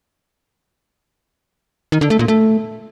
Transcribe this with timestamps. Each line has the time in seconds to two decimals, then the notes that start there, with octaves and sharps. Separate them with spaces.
1.92 D#3
2.01 D3
2.10 A3
2.19 A#2
2.28 A3